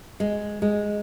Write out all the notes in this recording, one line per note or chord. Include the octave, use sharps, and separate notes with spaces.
G#3
G#3